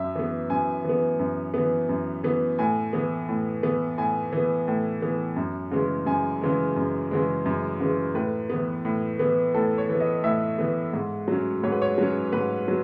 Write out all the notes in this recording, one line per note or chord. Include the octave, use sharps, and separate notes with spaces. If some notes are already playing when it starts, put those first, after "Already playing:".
Already playing: F#2 E5
E3 B3
F#2 G#5
E3 B3
F#2
E3 B3
F#2
E3 B3
A2 G#5
E3 B3
A2
E3 B3
A2 G#5
E3 B3
A2
E3 B3
F#2
C#3 E3 G#3
F#2 G#5
C#3 E3 G#3
F#2
C#3 E3 G#3
F#2
C#3 E3 G#3
A2 B4
E3 B3
A2
E3 B3
A2 A4
C#5
E3 B3
D#5
A2 E5
E3 B3
G#2
F#3 C#4
G#2 C#5
B4
C#5
F#3 C#4
G#2 B4
F#3